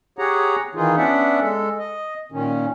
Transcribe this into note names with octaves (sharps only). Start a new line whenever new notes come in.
G4 G#4 C#5 F#5 A#5
D#3 E3 D#4 F4 G#4
B3 C#4 D4 D5 E5 F#5
G#3 A4
D#5
A#2 D#3 C#4